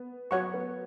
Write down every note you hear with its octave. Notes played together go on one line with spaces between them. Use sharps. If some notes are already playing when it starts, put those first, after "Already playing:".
Already playing: B3
F#3 F#4 C#5 F#5 C#6
B3